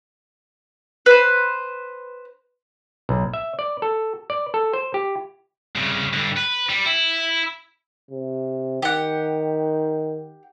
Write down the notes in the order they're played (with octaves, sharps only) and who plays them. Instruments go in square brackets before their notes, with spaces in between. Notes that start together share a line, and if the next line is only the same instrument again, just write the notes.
[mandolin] B4 C5
[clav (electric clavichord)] B1
E5
D5
A4
D5
A4
C5
G4
[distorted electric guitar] C2 C#3
G2 D3
B4
G3
E4
[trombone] C3
[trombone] D#3 [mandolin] G4 F#5